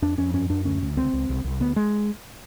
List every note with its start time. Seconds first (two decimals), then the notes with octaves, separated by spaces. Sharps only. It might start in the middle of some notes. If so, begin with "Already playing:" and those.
0.02 F2 D4
0.18 F2 C#4
0.34 F#2 C#4
0.50 F#2 D4
0.65 D2 C#4
0.82 D2
0.97 C#2 C4
1.13 C#2
1.29 C2
1.44 C2
1.60 D2 B3
1.76 G#3